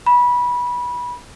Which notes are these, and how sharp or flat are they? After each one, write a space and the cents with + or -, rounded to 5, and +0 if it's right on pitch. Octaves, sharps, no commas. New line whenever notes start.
B5 -20